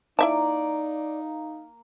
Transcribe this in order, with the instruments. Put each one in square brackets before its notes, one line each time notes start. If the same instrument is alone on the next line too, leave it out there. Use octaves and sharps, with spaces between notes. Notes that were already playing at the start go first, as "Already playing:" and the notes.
[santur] A#3 [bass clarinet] D#4 [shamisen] E4 E5 A5 [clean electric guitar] D5